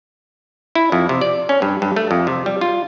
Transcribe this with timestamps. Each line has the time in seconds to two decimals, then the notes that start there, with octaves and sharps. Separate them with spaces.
0.75 E4
0.92 F2
1.09 C3
1.21 D5
1.49 C#4
1.62 G2
1.82 G2
1.96 A3
2.11 F2
2.27 C3
2.46 G3
2.61 F4